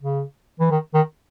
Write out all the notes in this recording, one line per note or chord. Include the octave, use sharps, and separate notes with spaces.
C#3
E3
D#3
D#3